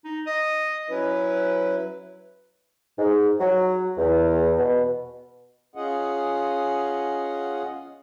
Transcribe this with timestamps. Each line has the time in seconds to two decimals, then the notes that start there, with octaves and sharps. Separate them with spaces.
0.05 D#4
0.27 D#5
0.90 F#3 C#4 E4 B4
2.98 G#2
3.40 F#3
3.98 E2
4.58 B2
5.76 C#4 F4 G#4 D#5 F#5